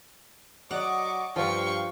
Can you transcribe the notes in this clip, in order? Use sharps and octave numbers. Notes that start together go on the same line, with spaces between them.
F#3 D5 D#5 F#5 C#6 D6
G2 F3 F5 G5 C#6